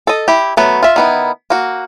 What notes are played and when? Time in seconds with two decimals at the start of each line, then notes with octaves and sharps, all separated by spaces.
0.07 A4 D#5
0.28 E4 G4
0.57 F#3 A3 B3
0.82 F4 E5
0.96 D#3 B3 E4
1.50 A#3 F#4